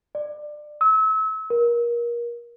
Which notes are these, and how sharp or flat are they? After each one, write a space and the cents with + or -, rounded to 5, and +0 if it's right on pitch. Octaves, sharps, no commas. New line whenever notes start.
D5 +20
E6 -30
A#4 +25